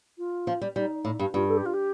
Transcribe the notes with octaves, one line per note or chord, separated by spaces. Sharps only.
F4
F3
G3
G3 D#4
A2
G2
G2 F4
A4
G4
F4
G4